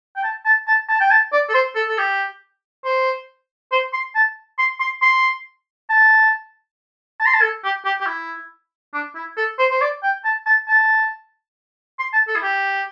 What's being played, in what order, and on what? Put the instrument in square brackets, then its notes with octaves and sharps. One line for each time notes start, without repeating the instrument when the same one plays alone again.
[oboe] G5
A5
A5
A5
A5
G5
A5
D5
A4
C5
A4
A4
G4
C5
C5
C6
A5
C6
C6
C6
A5
A5
C6
A5
A4
G4
G4
G4
E4
D4
E4
A4
C5
C5
D5
G5
A5
A5
A5
C6
A5
A4
E4
G4